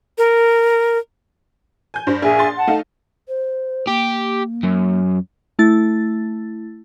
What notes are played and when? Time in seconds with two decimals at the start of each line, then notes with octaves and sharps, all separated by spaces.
0.18 A#4
1.94 G#5 G6
2.07 G2 C5
2.22 A#1 G#4 E5 G#5
2.39 C6 A6
2.56 F#5 A5
2.67 A3 D#4 F5
3.28 C5
3.88 A#3 G4
4.64 F#2
5.59 A3 E4 A6